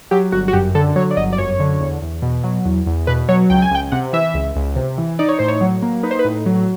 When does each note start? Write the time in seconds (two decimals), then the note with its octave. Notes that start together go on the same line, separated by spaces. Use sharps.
0.11 F#3 G4
0.32 G1 F#4
0.48 F#4
0.53 F#2 G4
0.75 D3 A4
0.96 F#3 C#5
1.11 D5
1.17 G1 D#5
1.33 D5
1.38 F#2 C#5
1.60 D3
1.80 E2
2.02 E2
2.22 B2
2.44 F#3
2.65 E2
2.86 E2
3.07 B2 B4
3.29 F#3 C#5
3.50 C#2 G5
3.62 G#5
3.71 C#2 G5
3.92 C3 F#5
4.13 E3 E5
4.34 C#2
4.55 C#2
4.76 C3
4.98 E3
5.19 D#4 D5
5.29 C#5
5.39 A2 C5
5.48 C#5
5.61 F#3
5.82 A#3
6.03 D#4 B4
6.11 C5
6.19 B4
6.25 A2
6.46 F#3